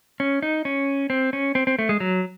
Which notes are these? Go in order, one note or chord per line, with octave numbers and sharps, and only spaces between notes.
C#4
D#4
C#4
C4
C#4
C4
C4
A3
G#3
F#3